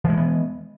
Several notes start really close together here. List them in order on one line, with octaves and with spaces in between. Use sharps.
E3 G#3 A#3 B3